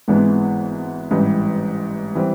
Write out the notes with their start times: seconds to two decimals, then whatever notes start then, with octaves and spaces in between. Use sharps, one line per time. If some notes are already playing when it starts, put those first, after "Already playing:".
0.08 G#1 G#2 E3 G#3 B3
1.11 A1 G#2 E3 G3
2.15 E3 G3 C4